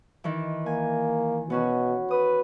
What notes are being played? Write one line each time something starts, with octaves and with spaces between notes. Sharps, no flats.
D#3 E3
A#3 G#5
B2 B3 C#4 F#4
B4 D#6